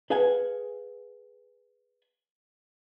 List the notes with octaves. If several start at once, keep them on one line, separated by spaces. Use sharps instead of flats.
G#4 B4 F5 F#5 G#5